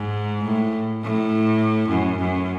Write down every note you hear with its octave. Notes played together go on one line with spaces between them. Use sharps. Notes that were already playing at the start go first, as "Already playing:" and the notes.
Already playing: G#2
A2
A2
F#2
F#2